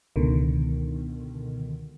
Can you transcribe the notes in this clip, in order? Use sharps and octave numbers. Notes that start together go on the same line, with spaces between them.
C#2 B2 D3 D#3